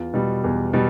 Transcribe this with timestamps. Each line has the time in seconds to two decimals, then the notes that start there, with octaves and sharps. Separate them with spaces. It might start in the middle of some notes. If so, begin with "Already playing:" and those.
Already playing: E2 F4
0.14 B2 G3
0.44 E2
0.73 B2 G3